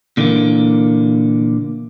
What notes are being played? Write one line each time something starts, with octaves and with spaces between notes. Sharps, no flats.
A#2 D3 E3 G3 A#3